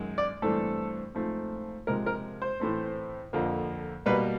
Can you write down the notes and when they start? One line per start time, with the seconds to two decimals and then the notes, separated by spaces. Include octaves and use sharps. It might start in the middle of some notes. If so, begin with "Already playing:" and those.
Already playing: F#2 D#3 G#3
0.18 D5
0.42 G2 E3 A3 C4 A4
1.15 G#2 F3 A3 C4
1.87 C3 F3 G#3 A#4
2.06 A#4
2.42 C5
2.60 A2 E3 A3 C4
3.33 F2 D3 F3 A#3
4.06 B2 G3 A#3 B4